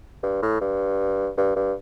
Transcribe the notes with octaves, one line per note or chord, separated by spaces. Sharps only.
G2
A2
G2
G2
G2